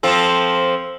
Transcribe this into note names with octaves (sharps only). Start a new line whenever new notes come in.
F3 C4 A4